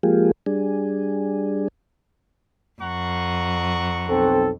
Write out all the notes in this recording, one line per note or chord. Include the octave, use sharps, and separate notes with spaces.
F3 G#3 A#3 F4 G4 G#4
G3 D4 G#4
F2 F#5 A#5 C#6
B1 C4 A4